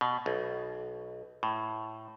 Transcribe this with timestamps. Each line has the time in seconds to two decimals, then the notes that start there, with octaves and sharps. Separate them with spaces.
0.01 B2
0.26 B1
1.43 A2